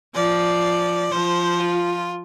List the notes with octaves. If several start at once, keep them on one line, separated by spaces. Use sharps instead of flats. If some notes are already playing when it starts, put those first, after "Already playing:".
F3 D5
F3 C5
F4